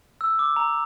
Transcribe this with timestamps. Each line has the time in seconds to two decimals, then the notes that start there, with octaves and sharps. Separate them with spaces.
0.21 E6
0.39 D6
0.56 A#5